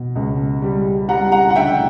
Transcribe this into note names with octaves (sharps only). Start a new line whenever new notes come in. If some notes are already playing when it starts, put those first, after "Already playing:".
Already playing: B2
C#2
G3
G3 F#5 A#5
F#5 A#5
F#5
D2 E5 G5